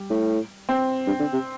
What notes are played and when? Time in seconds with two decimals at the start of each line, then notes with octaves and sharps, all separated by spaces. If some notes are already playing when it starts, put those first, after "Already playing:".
Already playing: G3
0.10 A2
0.69 C4
1.07 G2
1.19 D3
1.33 C3